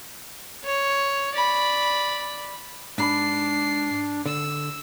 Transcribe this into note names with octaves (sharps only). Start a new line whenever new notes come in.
C#5
D5 B5
G#2 D4 A#5 B5 C7
D3 E6